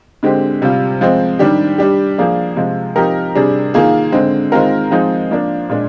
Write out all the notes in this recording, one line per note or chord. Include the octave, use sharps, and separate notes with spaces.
D3 G#3 C4 G4
C3 G3 C4 F4
F3 G#3 C4
D#3 G3 D4 G4
G3 D4 G4
F3 A#3 D4 G#4
C3 F3 G#3
F3 C4 D#4 G4 A#4
C3 G3 D4 G#4
D#3 A#3 F4 G#4
D3 G#3 C4
D#3 G#3 C4 F4 A#4
F3 G#3 C4 D#4 G#4
F3 A#3 D4
A#2 G#3 D4